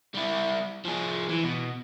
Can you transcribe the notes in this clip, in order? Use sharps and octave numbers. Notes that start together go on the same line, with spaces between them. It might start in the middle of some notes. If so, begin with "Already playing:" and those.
G3 E4
F3 G#4
E3
B2